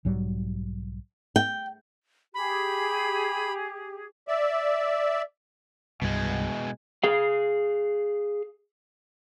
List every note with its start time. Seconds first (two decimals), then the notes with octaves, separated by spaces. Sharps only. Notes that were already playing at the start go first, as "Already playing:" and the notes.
0.05 B1 G#2 F#3 G3
1.36 G5
2.34 G4 G#4 B5
4.28 D5 E5
6.02 C2 G2 B2 G#3
7.04 G#4 F5